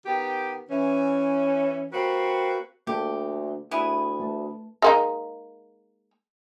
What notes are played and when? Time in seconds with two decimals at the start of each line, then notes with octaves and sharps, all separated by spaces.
0.05 D#3 B3 G4
0.71 E3 C#4
1.92 A#3 C4 F#4 G4 B4
2.87 D2 A#3 G4 A4
3.71 D2 B3 E4 G#4
4.20 A3 B4 A5
4.82 G#3 A#3 D#4